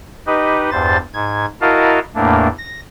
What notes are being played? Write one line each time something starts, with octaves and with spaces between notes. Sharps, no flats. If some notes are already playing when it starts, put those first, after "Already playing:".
D#4 G4 B4 D#5
E2 G2 C5 A6
G#2 G#6
E4 F#4 A#4 D#5 F5 A5
E2 A2 A3 A#3 D4
A#6